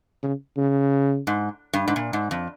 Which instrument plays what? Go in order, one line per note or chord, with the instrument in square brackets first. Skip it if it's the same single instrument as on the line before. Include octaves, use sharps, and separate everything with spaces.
[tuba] C#3
C#3
[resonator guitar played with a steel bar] G#2
G2
G#2
A#2
G#2
F2